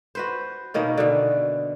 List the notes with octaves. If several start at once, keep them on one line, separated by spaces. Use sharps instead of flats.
F#4 B4 C5
B2 D#3 A#3 C#4
B2 D3